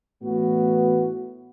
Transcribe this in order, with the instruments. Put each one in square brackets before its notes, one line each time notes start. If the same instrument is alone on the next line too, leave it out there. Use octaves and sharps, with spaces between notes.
[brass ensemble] A2 E3 B3 F#4